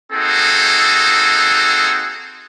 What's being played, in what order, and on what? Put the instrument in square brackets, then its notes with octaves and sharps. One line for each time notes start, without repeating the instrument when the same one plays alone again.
[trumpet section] A#3 C4 D#4 F#4 G#4 A4